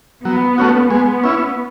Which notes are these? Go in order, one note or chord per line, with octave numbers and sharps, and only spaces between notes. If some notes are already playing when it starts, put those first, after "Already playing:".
F#3 B3
A3 C#4 F#4
G#3 B3
C#4 E4